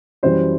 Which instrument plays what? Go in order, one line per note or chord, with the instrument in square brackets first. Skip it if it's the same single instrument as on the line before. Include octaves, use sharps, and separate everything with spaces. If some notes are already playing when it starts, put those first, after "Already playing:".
[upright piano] F#2 E3 G3 C5